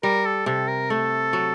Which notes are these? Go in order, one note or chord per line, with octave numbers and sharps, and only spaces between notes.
G3 A#4
A4
C3 A4
A#4
A3 A4
F#3